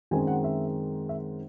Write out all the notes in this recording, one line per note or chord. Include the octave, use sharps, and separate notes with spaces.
F#2 D#3 G#3 C4 G#5
F#5
E5
E5